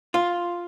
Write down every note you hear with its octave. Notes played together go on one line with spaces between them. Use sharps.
F4